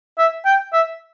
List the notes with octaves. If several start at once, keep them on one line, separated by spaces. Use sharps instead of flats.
E5
G5
E5